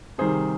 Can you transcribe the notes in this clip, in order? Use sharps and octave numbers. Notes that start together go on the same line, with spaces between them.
C3 D#3 G3 G#4 C5